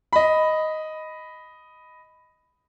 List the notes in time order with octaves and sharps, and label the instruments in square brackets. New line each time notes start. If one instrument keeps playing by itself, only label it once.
[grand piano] D#5 B5